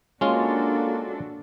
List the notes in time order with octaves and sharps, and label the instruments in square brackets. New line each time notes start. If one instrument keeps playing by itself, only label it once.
[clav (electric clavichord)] G#3 C#4 F4 [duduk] A#3 [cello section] D4 F#4 A4